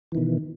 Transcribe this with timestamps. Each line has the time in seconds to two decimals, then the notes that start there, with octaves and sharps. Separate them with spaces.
0.12 E3
0.15 D#3
0.17 B2